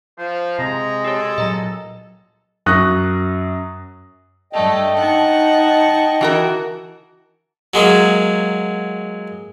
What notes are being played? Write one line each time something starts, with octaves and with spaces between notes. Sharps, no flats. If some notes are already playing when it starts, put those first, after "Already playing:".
F3 C5
C3 G#3 A#5
G4 A4 C#5
A#2 F#3 D#5 A#5 A#6
F#2 C#6 D#6 F#6 A#6
G2 A3 D5 D#5 G5
D#4 F#5 A5 C#6
E3 F#4 A#4
F#3 G#3 A#3